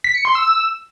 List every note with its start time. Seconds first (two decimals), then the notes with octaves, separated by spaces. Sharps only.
0.04 B6
0.15 C#7
0.25 C6
0.35 E6